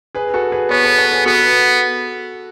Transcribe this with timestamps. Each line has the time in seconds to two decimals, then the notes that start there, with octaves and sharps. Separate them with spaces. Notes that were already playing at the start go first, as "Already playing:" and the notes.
0.15 G#4 B4
0.34 F#4 A4
0.52 G#4 B4
0.70 B3 A4 C#5
0.84 A4 C#5
0.98 A4 C#5
1.12 G#4 B4
1.26 B3 F#4 A4